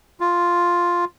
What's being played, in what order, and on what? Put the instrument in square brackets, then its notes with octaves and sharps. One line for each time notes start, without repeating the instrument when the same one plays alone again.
[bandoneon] F4